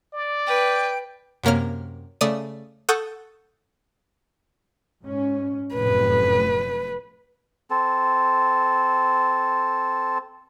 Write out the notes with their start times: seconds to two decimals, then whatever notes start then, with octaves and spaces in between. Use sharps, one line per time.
0.14 D5
0.47 B4 G5
1.44 F#2 C3 A#3 C#5 F6
2.21 C#3 A3 D5 D#6 D#7
2.89 A4 F#5 C#6 D#6 G6
5.04 G#2 C#4
5.75 F1 F#2 A2 B4
7.70 C4 A4